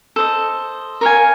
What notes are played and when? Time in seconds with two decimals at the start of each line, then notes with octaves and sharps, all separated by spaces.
0.16 A4 C5 D#5
1.01 A#4 C#5 F5 G#5